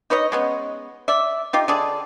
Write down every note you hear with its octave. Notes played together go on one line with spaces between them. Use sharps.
D#4 B4 C#5 D#5
G#3 B3 C#4
D5 E5
D#4 F4 G4
D3 G#4 D5